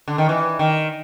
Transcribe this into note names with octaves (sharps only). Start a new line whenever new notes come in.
D3
D#3
E3
D#3